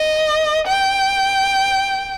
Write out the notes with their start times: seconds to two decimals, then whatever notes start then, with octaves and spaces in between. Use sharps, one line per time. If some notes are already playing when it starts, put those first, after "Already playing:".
Already playing: D#5
0.67 G5